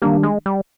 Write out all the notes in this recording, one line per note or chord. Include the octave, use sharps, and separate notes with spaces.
D#3 G3 A#3 D4 G4
G#3
G3